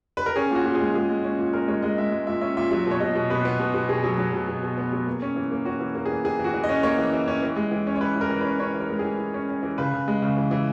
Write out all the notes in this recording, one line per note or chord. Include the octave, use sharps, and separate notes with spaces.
B4
A#4
C#4 G#4
A#2 F#4
A#2
G#4
G#3
A#2 G#4
G#3
C#4
A#2
C#4 A#4
G#3 C#5
G#3 D#5
G#3 E5
G#3
A#2 E5
C#4 E5
A#2 E5
F#3 E5
B2 C#5
B2 D#5
B2
B2 B4
B3
B2
B2
B2 G#4
F#3
F#3
B2
B2
B2
B3
F#3
A#3
C#4
E3
A#3
C#4 F#4
E3
A#3
E3 G#4
E3 G#4
E3
F#4
E3
D#5
C#4
A#3 C#5
E3
E3
C#4
E3
G#3
E3
C#4
C#5
E3 B4
E3 A#4
E3
C#4 B4
C#4 C#5
E3
A#4
G#3
G#4
E3
E3
C#4
C#4
E3
C#3 B4
C#3
G#3
C#3
E3
E3